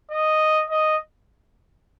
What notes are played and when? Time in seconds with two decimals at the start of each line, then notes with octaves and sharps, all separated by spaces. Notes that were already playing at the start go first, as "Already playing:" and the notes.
0.11 D#5
0.70 D#5